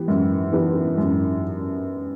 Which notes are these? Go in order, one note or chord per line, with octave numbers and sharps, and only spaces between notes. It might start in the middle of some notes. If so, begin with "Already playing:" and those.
Already playing: E3 B3 G4
F#2
E3 B3 D4 G4
F#2